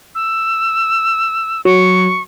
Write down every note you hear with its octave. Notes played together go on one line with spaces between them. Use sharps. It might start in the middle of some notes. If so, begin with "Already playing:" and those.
E6
F#3 C#6